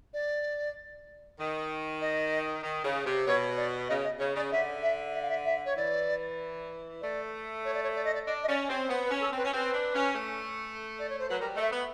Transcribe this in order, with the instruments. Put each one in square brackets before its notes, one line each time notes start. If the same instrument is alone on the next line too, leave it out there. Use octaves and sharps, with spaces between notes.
[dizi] D5
[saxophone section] D#3
[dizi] D#5
[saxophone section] D#3
C#3
C3
[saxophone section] B2 [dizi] C#5
[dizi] D5
[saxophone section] C#3 [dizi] D#5
[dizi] D#5
[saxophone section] C#3 [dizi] C#5
[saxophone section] C#3 [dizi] D5
[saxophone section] D3 [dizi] E5
[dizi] E5
E5
F5
E5
E5
C#5
[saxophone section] E3 [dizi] D5
[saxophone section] A3 [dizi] D5
[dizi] C#5
D5
C#5
D5
D#5
D5
[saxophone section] D4 [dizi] D#5
[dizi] D#5
[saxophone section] C#4 [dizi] D5
[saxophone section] C4 [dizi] C#5
[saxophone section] B3 [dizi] C5
[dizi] B4
[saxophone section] C#4
[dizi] A4
[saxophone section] C4
[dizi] B4
[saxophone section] C#4
[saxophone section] C4 [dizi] B4
[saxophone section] D4
C#4
A3
[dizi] D5
C#5
C5
[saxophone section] F#3 [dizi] B4
[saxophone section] G3 [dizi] A#4
[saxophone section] A3 [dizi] D#5 E5
[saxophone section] B3